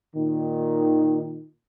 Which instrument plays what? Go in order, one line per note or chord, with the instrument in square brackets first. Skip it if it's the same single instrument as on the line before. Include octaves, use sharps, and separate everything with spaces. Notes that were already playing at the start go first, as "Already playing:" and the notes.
[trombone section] A#2 D#3